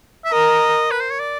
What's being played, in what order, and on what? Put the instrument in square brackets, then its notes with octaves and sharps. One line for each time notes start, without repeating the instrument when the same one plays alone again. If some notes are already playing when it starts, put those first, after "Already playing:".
[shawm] E5
[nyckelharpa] A#4 [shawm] D#5
[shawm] B4
C5
C#5
D5